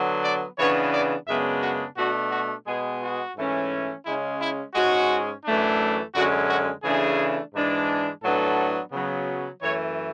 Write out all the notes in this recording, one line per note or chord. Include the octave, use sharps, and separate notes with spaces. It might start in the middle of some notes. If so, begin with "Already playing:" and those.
Already playing: D3 F#3 B3
D5
C#3 E3 B3 D4 C#5
D5
F#2 C#3 G#3 B3 D4 E5
F#4
B2 A3 D4 F#4
F#4
B2 G#3 B3 G#4
F#4
G#2 E3 A3 C#4
C#3 G#3 C#4 E4
E4
G#2 G#3 C#4 F#4
F#2 E3 A3 D4
F#2 D3 G#3 C#4 F#4
F#4
C#3 E3 A3 D4 G#4
G#2 E3 G#3 D4
A2 F#3 B3 D4 A4
C#3 F#3 B3
F#2 E3 A3 C#5